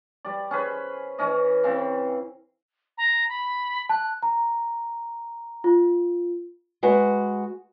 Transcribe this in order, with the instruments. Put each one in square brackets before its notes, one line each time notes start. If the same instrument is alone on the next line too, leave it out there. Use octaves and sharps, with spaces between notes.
[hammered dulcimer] G3 D5
C#4 G#4 B4 C5
E3 C#4 D#5
C#3 E3 C4
[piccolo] A#5
B5
[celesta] A5 [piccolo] F#6
[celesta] A#5
F4
[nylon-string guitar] G#3 F#4 B4 G#5